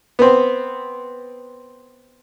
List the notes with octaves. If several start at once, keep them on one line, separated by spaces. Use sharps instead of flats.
B3 C4